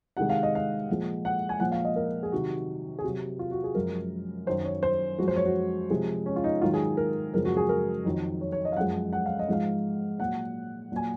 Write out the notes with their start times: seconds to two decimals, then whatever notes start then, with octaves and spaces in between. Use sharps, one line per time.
0.17 C3 D#3 G#3 F#5
0.30 F5
0.43 D#5
0.55 F5
0.89 A#2 F3 G#3
1.25 F#5
1.49 G#5
1.60 A#2 F3 G#3 F#5
1.72 F5
1.85 D#5
1.96 A#4
2.23 G#4
2.32 C3 D#3 F#3 F#4
2.99 G#4
3.04 C3 F#3 F#4
3.39 F4
3.51 F#4
3.64 G#4
3.75 F#2 F3 G#3 A#4
4.46 F#2 D#3 F#3 C5
4.65 C#5
4.83 C5
5.18 F#2 F3 G#3 F#4
5.28 C5
5.36 C#5
5.46 F#4
5.90 C3 F3 G#3
6.26 C#4
6.36 F4
6.44 D#4
6.61 G#2 D#3 F#3 F4
6.74 G#4
6.97 A#4
7.33 F#2 C#3 F3 G#3 A#4
7.45 F#4
7.57 G#4
7.69 A#4
8.05 F2 D#3 F#3
8.41 C#5
8.52 C#5
8.65 D#5
8.72 F5
8.77 F#2 F3 G#3 F#5
9.13 F#5
9.26 F5
9.39 D#5
9.48 G#2 F3 G#3 F5
10.19 A#2 F#3 F#5
10.92 A#2 F#3 G#5